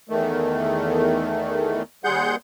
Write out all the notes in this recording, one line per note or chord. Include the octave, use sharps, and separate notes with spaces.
E2 D#3 A3
D#2 G3 G#4 F#5 C6 G6